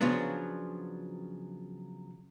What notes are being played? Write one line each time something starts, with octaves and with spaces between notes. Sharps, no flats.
C#3 F3 F#3 B3 D4